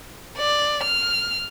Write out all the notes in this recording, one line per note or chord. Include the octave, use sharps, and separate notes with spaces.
D5
F6